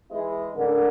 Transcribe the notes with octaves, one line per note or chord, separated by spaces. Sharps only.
E3 G#3 E4 G#4 D#5
A2 D3 A#4